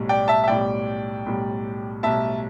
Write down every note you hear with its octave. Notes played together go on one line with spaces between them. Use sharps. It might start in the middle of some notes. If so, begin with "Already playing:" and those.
Already playing: B1 A2 G3
D5 G5
E5 A5
E5
B1 A2 G3 D5 G5
B1 A2 G3
B1 A2 G3 E5 A5